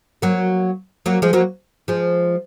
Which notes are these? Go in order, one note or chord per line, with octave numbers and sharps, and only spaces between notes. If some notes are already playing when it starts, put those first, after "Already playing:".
F#3 A#3
F#3 A#3
F3 G#3
F#3 A#3
F3 G#3